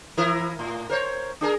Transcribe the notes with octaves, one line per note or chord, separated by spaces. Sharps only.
E3 E4 A#4
A2
A#4 C5 C#5
D4 G#4 A#4